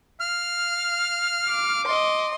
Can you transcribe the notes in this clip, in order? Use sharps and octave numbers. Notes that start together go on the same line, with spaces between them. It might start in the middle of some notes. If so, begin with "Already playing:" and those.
F5 F6
D6
D#5 C6